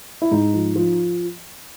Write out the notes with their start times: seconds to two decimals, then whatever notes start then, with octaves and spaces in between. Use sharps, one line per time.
0.22 E4
0.31 G#2 D#4
0.54 F3
0.76 F3